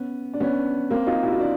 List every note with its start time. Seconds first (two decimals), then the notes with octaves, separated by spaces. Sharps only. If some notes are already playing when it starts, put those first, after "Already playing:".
Already playing: B3 C#4
0.34 D4
0.40 B3 C#4
0.90 A#3 C4
1.06 D#4 F4
1.23 E4 F#4
1.32 F4
1.40 D4 E4